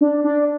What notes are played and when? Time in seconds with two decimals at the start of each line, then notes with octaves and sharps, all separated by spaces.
0.01 D4
0.24 D4